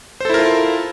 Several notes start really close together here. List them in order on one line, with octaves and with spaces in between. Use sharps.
C5 A4 E4 A#4 F4